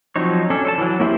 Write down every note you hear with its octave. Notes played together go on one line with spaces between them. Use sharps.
F3 F#3 C4 D#4 C#5
C#4 D4 A4
A4 C5 A5
E3 F#3
A#3 C#4 E4 G4 C5